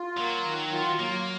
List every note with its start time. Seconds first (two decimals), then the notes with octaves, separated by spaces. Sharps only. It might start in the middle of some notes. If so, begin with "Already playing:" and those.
Already playing: F4
0.17 F#3 A#3
0.45 D#3
0.73 F4
1.00 F#3 A#3